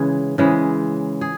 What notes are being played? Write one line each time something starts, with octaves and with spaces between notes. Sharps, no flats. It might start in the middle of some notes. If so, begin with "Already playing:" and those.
Already playing: C#3 E3 G#3 G#4
C#3 E3 G#3
G#4